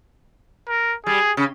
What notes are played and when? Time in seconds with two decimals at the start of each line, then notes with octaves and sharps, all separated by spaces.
0.69 A#4
1.06 G3 G#4
1.37 C#3